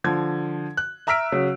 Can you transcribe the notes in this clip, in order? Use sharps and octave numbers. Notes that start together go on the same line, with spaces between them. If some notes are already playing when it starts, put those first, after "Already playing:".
D3 F3 G#6
F#6
E5 A#5 E6 F6 B6 D7
C#3 F#3